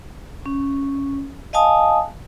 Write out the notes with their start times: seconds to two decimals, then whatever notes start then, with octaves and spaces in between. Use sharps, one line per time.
0.46 C#4
1.53 D#5 F5 G#5 A5 D#6